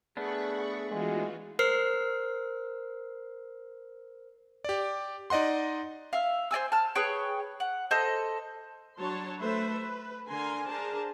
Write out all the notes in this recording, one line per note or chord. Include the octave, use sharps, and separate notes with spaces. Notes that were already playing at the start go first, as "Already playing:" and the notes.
A3 B3 D4 G#4 F#5 B5 C#6
E3 G#3 F4 F#4
A#4 C5 F6 C7
G4 D5
D#4 D5 D#5 F#5 C6
E5 F5
C5 D5 G#5 E6
A5 F6
G#4 B4 C#5 G5
F#5
A4 C5 D#5
F#3 D4 C#5 A5 C6
A3 A4 B4 C5 E5
B4
D3 A#4 G#5 C6
D4 G#4 A#4 C5 A5